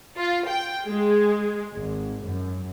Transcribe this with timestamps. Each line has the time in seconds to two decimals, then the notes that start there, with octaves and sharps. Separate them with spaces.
0.18 F4
0.49 G5
0.86 G#3
1.76 G#1
2.24 F#2